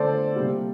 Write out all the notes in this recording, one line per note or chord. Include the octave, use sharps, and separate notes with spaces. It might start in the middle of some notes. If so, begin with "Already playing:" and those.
Already playing: D3 A3 A4 C5 D5
C3 G3 A#3